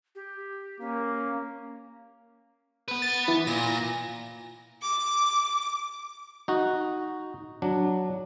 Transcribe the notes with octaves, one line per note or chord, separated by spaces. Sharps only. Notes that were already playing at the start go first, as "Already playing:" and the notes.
G4
A#3 C#4
B3 B4
A6
E3
A#2 A#6
D6
D#4 F#4
F#3 D4